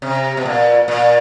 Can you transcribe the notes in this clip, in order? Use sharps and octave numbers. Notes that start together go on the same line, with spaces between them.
C3
B2
A#2
A#2